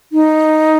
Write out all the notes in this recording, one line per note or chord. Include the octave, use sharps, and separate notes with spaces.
D#4